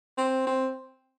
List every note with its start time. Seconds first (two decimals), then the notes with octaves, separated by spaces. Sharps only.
0.18 C4
0.47 C4